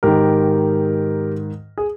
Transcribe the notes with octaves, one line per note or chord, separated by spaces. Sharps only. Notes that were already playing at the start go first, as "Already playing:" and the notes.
G#2 D#3 G4 A#4
G#4